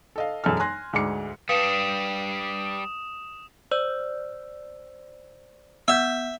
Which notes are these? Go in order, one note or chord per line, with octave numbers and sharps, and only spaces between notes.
A4 D#5 F5
E1 F#2 G#3 A4 F6
G#5 C6 F#6 A#6
D2 G#2 G#3 D6 C#7
G3 D4 B4 F5 D#6 C#7 E7
C5 D5 E6
B3 E5 F#5 G6